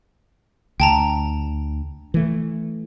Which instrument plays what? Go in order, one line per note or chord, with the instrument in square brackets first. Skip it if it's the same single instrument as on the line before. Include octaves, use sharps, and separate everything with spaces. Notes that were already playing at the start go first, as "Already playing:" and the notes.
[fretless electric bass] D2 [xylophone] G5 A5 A#5
[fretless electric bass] E3 A3